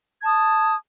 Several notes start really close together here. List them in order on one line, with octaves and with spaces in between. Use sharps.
G#6 A5 D#6